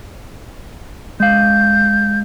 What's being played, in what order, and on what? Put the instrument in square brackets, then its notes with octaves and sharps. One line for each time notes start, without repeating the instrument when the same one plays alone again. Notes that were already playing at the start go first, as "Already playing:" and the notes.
[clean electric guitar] G#3 F5 [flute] G6